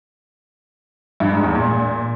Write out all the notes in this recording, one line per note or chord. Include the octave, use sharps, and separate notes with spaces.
G2
G#2
E2
A#2